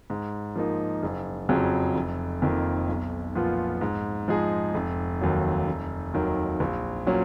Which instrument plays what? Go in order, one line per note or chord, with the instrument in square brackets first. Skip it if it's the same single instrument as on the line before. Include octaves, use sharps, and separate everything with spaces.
[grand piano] G#2
F3 A#3 D#4
F#1
F2 C#3 F#3
F1
F2 D#3 A#3
B1
A#2 F3 B3 F4
G#2
F3 G#3 D#4 G#4
F1
D#2 D#3 F#3
F1
D#2 D#3 F#3
A#1
A#2 F#3 C#4